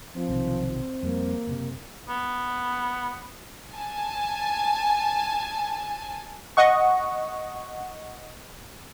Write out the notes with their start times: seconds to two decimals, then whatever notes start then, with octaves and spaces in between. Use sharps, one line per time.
0.14 F3 C4
0.29 B1 C3 D#3
1.03 F2 G3 A#3
1.47 F#1 C3
2.09 B3
3.73 G#5 A5
6.57 D#5 F#5 C#6